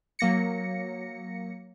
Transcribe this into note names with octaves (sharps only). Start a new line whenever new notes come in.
F#3 A#3 A#6 C#7